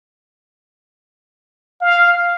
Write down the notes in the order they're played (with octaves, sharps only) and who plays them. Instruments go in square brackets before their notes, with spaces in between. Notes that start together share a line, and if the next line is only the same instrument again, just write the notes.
[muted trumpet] F5